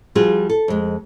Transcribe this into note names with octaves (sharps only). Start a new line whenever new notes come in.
F3 G3 C4 F4 F#4 G#4
A4
F2 G#3